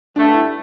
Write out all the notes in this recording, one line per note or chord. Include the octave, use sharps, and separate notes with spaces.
G2 D3 A3 D4
E4